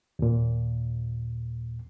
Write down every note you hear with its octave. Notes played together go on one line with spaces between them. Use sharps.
D#2 A#2